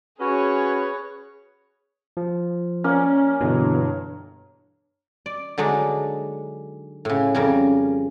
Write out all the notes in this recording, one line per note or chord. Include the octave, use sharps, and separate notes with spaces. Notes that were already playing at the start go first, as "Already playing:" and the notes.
C#4 F#4 G#4 B4 C#5
F3
A#3 C#4 C#5 D5
G2 B2 D3 E3
D5
D3 F#3 G#3 D4 D#4
A2 C#3
F2 C#3 G3 C#4 A#4